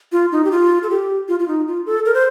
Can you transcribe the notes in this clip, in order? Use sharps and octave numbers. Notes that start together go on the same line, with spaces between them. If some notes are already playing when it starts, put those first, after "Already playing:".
F4
D#4
G4
F4
A4
G4
F4
F4
D#4
F4
A4
A#4
C5